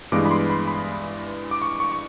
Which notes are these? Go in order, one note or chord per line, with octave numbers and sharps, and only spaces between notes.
G2 E3 G#3 B3 D6
B5
C6
B5
B5
D6
C#6
C#6
C#6